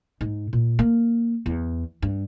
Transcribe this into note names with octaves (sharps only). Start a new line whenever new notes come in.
G#2
A#2
A#3
E2
G2